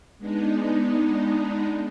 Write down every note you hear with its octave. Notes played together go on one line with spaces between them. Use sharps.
G#3 B3 D4 D#4